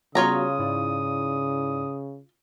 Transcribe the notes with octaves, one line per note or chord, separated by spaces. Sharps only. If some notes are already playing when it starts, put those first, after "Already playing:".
C#3 G3 B3 F4 F#4 C#5 A#5 D#6
G#2 E4 D5